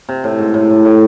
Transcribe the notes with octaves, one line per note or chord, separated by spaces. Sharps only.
C3
A2
G#2
A2
A2
A2